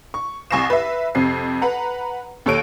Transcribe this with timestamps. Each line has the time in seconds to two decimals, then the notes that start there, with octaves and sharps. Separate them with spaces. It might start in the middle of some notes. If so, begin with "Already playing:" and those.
0.14 C#6
0.51 C2 G#5 C#6 A#6 C7 E7
0.70 B4 E5
1.15 F2 C3 C7
1.62 B4 F#5 A#5
2.46 D#2 A4 C#5 D7 D#7